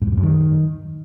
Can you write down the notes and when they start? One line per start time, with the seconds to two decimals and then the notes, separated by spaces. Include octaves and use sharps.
0.02 G#2
0.07 F#2
0.12 G#2
0.17 F#2
0.23 D#3